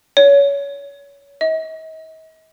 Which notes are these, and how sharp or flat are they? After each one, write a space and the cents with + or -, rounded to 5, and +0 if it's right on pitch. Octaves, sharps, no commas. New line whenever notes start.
C#5 +25
D#5 +45